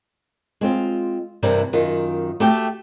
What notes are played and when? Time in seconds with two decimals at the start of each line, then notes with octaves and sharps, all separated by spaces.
0.61 G#3 C4 F4
1.43 G2 C3 E3 G3 C4 A#4
1.73 F#2 D#3 F4
2.40 A3 F#4 G4 A4 G5